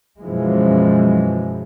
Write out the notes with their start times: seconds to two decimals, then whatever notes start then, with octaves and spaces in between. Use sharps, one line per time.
0.20 F#2 B2 E3 F3 G#3